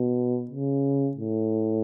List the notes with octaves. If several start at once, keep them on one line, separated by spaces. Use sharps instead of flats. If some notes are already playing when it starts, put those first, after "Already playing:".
Already playing: B2
C#3
A2